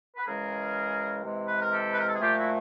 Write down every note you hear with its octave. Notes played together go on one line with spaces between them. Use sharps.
B4
C#3 E3 G#3 G#4 A#4
C3 E3 G#3
B4
A#4
G4 A4
B4
A#4
A4
G#4
A#2 F3 A3 F4 G4
E4 F#4